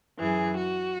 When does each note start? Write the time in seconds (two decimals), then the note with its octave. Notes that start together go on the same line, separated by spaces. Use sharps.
0.19 F#2 E3 G#4
0.55 F#4